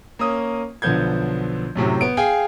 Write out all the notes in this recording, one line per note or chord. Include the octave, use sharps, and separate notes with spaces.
A#3 C#4 D#6
B1 D3 F3 B3 G6 G#6
F#2 A2 C3 F#3
B3 D7
G#4 F5 G5 G#5